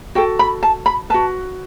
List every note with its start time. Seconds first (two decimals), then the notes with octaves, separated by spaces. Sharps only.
0.15 F#4 A4 G5
0.39 B5
0.63 A5
0.86 B5
1.10 F#4 B4 A5